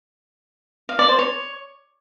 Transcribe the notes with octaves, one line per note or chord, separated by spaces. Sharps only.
F5
D5
C5
C#5